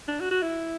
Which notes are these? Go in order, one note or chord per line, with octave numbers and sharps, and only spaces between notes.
D4
F#4
F#4
E4